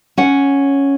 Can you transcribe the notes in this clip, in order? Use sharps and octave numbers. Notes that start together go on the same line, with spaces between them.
C#4 F#5